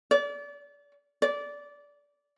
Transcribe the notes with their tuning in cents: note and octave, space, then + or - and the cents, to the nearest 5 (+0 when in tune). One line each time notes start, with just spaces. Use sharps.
D5 -30
D5 -20